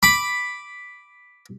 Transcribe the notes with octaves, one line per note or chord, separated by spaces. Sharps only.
B5 D6